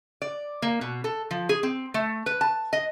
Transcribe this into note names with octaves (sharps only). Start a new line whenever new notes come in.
D5
A#3
B2
A4
F3
G#4
C4
A3
B4
A5
D#5